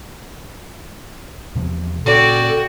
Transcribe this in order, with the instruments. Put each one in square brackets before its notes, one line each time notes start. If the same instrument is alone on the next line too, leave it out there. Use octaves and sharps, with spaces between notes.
[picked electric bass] E2 C3 F3
[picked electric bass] A#2 C#3 [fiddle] F#4 G5 [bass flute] A4 [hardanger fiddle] D5